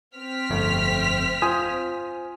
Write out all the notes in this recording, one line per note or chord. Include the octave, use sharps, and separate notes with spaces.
C4 F6 B6
G1 F2 A3
F4 C5 G#5 D#6